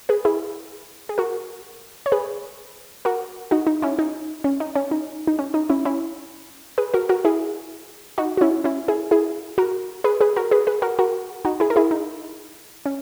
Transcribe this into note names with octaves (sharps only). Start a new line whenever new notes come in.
G#4 B4
E4 G#4
G#4
F#4 A#4
C#5
G#4 B4
F#4 A#4
D#4 F#4
D#4
C#4 E4
D#4
C#4
D#4
C#4
D#4
D#4
C#4
D#4
C#4 E4
C#4 E4
G#4 B4
F#4 A#4
F#4 A#4
E4 G#4
D#4 F#4
F#4
C#4 E4
C#4 E4
E4 G#4
E4 G#4
F#4 A#4
G#4 B4
G#4 B4
F#4 A#4
G#4 B4
G#4 B4
F#4 A#4
F#4 A#4
D#4 F#4
E4 G#4
A#4
E4 G#4
D#4
C#4